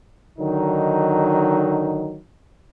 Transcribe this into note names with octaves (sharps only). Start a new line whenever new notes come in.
D3 D#3 F#3 D#4